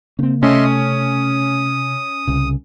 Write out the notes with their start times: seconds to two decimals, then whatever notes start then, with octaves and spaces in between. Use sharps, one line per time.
0.19 C#3 A#3 C4 C#4
0.43 C3 A3 C#4 D#5 E5 C6
0.64 D#6
2.27 C2 C#3